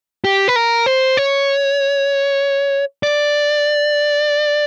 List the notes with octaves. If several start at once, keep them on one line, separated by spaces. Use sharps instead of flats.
G4
B4
A#4
C5
C#5
D5